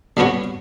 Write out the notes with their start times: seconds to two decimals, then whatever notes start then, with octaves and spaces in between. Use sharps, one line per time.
0.17 D3 G3 B3 F#4 C#5